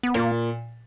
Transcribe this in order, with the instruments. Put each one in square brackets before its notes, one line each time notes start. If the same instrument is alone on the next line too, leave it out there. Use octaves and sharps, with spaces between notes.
[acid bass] B3
[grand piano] A#2 [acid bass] A#3